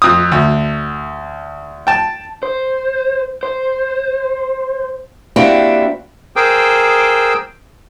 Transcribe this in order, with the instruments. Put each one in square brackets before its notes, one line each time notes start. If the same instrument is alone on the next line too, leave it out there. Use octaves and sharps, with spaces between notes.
[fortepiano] F2 D#6
D2
G5 A5
[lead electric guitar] C5
C5
[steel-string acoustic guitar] A#3 C4 D4 E4 F#4 G4
[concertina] G#4 A#4 C5 G5 D6 E6